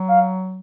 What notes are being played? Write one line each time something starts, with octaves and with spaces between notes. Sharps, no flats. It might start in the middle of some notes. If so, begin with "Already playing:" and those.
Already playing: F#3
F5